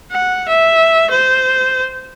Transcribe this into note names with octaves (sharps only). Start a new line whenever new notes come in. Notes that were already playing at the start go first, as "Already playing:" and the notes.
F#5
E5
C5